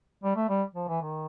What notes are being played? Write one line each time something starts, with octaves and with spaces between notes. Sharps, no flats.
G3
A3
G3
F3
E3
D#3